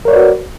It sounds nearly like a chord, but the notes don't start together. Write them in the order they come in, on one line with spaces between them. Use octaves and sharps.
A#4 C#5 D5 B4 F#4